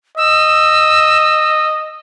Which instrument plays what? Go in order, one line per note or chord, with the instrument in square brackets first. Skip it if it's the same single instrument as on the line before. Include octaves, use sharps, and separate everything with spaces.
[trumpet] D#5 [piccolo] E6